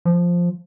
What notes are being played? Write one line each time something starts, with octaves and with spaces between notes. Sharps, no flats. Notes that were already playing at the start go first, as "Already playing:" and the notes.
F3